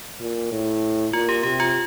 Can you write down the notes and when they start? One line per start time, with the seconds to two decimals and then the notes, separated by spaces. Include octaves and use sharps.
0.20 A#2
0.52 A2
1.13 A#2 F4
1.29 G4
1.43 C3 G4
1.60 F4